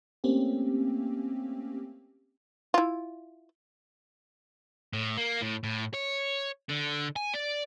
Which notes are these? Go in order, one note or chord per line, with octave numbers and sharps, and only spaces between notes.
A3 A#3 C4 C#4 G4
E4 F4
A2
A#3
A2
A2
C#5
D3
G#5
D5